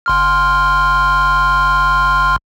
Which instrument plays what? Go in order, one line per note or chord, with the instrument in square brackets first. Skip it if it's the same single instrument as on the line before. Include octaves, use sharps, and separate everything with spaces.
[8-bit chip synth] G1 C6 F6